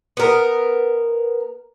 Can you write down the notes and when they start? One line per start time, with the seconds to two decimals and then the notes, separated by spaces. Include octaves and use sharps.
0.17 B3 A#4